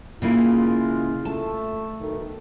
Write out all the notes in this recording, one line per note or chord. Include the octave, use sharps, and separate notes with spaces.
C#3 G#3 A#3 E4 F4
A3 A5
B1 D#3 A3